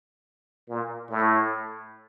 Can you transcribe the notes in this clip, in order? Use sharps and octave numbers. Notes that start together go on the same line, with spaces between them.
A#2
A2